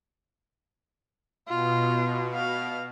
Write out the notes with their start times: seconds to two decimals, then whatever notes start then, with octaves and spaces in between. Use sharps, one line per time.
1.49 B2 F4
2.35 F5